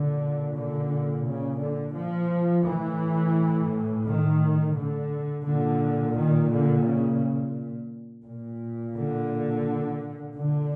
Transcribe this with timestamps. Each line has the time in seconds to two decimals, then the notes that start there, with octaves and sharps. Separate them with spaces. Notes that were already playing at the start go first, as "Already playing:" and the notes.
Already playing: A#2 D3
0.56 D3
1.26 C#3
1.61 D3
1.97 F3
2.66 A2 E3
4.06 D#3
4.77 D3
5.46 A#2 D3
6.16 D#3
6.51 D3
6.86 C#3
8.26 A#2
8.97 D3
10.36 D3